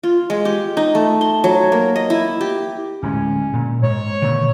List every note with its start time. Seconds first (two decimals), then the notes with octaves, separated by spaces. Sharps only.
0.03 F4
0.30 G#3
0.45 G4
0.77 D#4
0.95 A3
1.21 C6
1.44 F#3
1.72 A#3
1.96 D#5
2.10 E4
2.41 G4
3.03 D1 G#3 C#4
3.53 A#2
3.83 G#2 C#5
4.22 A#2 D3 D#3